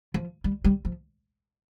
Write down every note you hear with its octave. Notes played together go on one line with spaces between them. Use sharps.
F3
G3
G3
F3